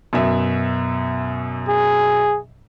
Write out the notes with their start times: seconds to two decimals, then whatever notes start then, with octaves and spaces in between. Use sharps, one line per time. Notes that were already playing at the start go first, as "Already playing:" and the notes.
0.13 F#2 B2 E5
1.69 G#4